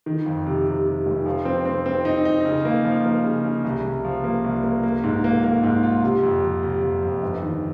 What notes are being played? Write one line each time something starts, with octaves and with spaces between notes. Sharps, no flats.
D#3
F2
C3
C3
C3
F1
F3
C4
C4
C4
D#4
D#4
C#3
A#3
F3
A#3
C#3
C#3
C2
C2
F3
A#3
C2
A#3
A#3
G#2
A#3
A#3
G#2
F4
C3
F2
C3
C3
F2
F2
G1
D#3